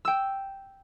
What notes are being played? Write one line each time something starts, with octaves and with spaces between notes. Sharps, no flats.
G5 E6